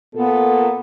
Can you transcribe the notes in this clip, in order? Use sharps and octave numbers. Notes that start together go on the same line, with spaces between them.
A#2 B3 A4